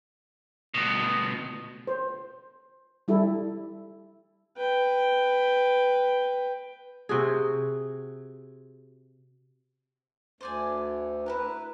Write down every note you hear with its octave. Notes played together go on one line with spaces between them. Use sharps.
D2 B2
C5
G3 E4 A4
B4 G5
C3 F#4 G#4
D2 C5 D5 G#5
E4 G4 A#4 B4